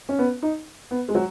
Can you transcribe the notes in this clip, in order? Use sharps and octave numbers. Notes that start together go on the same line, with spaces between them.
C#4
B3
D#4
B3
G#3
F#3